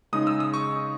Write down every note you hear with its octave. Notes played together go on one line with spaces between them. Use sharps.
C#3 G#3 D#4 D#6
E6
D#6
C#6